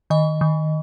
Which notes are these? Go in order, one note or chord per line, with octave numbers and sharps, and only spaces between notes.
D#3 D#5
D#3